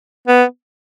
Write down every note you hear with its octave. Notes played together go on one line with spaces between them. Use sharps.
B3